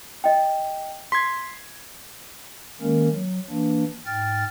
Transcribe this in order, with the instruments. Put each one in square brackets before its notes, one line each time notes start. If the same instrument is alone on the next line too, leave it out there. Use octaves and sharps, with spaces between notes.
[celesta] D#5 G5
[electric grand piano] C6 G#6 [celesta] B6
[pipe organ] D#3 G#3 A#3 C#4 A#4
F#3
E3 A#3 D4
G#2 G5 F6 A6